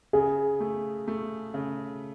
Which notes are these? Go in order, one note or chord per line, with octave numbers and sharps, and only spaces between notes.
C#3 G#4
A3
A3
C#3